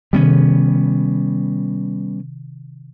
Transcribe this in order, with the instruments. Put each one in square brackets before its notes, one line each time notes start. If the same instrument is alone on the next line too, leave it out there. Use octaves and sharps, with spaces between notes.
[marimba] C3 D#3 [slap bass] G3 B3 C#4